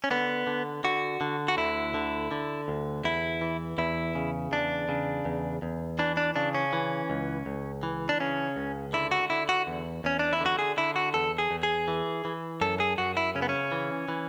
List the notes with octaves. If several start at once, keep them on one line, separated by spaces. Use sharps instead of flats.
C#4
D3 B3
D3
D3 F#4
D3
F#4
D2 E4
D3
D3
D2
E2 E4
E3
E2 E4
C#3
E2 D4
C#3
E2
E2
E3 D4
D4
C#3 D4
C#4
E3
C#2
C#2
E3
D4
C#3 C#4
C#2
D3 E4
F#4
D3 E4
F#4
E2
E2 C#4
D4
E4
D3
F#4
G#4
D3 E4
F#4
E2 A4
G#4
E2
G#4
E3
E3
F#2 A4
G#4
F#2 F#4
E4
C#3 C#4
B3
C#4
E3
E3